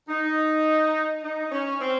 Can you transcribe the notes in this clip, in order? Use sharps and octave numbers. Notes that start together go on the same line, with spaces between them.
D#4
D#4
C#4
C4